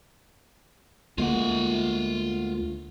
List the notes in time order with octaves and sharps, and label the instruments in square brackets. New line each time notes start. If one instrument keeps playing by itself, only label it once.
[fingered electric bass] D2 G#3 A#3 [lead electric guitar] F4 F#5